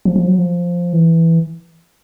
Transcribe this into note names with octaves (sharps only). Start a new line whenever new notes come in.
F3
F3
F#3
F3
E3